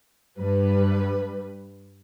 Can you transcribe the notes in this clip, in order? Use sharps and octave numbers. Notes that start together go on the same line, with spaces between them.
G2 G3 B4